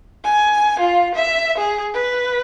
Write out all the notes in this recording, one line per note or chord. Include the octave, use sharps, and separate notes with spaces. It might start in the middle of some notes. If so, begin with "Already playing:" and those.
G#5
F4
E5
G#4
B4